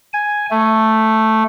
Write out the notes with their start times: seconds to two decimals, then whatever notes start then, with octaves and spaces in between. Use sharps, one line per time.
0.14 G#5
0.51 A3